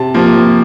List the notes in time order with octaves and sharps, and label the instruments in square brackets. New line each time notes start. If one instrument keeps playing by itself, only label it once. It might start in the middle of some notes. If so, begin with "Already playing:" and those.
Already playing: [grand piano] C3 A5
F3 A#3